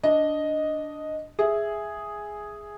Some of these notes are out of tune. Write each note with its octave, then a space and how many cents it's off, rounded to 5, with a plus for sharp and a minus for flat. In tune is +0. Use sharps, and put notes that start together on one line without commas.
D4 -5 D#5 +0
G#4 +0 E5 +0